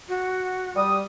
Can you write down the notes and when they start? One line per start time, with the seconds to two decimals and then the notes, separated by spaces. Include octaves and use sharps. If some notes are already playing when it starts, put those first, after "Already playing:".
0.09 F#4
0.76 G3 D#6